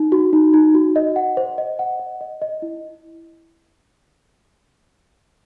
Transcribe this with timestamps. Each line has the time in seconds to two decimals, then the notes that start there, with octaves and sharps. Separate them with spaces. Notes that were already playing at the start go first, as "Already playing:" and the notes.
Already playing: D#4
0.12 F#4
0.33 D#4
0.54 D#4
0.75 F#4
0.96 D#5
1.16 F#5
1.37 C5
1.58 D#5
1.79 F#5
2.00 D#5
2.21 D#5
2.42 D#5
2.62 E4